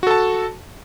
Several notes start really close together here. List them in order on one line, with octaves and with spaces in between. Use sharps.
F#4 A4 A5